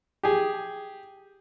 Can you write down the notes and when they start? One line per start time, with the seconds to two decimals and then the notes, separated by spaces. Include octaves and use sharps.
0.23 G4 G#4